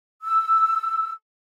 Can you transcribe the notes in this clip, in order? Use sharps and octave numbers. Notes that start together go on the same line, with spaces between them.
E6